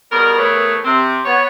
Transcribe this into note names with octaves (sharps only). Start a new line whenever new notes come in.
B2 G3 G#4 A#4
E3 A3 B3 G#4 A#4 C#5
C3 C4
B3 C#5